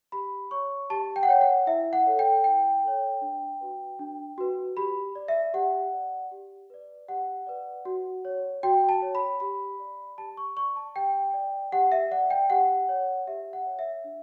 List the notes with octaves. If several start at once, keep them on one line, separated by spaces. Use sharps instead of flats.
G4 B5
C#5 C#6
G4 A5
G5
F#5
C#5 G5
F#5
E4 E5
F#5
A4 C#5
G5
E4 G5
A4 C#5
D4
F#4 B4
D4
F#4 B4
G4 B5
D5
E5
G4 F#5
D5
G4
B4 D5
G4 F#5
B4 D5
F#4
C#5
F#4 G5
A5
C#5
B5
G4 B5
D5
G4 A5
C#6
D5 C#6
A5
G4 G5
D5
G4 F#5
E5
D5 F#5
G5
G4 F#5
C#5
G4 E5
F#5
C#5
E5
D4